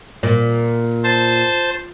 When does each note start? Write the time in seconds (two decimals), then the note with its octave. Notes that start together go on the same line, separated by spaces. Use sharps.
0.23 A#2
1.04 C5 A5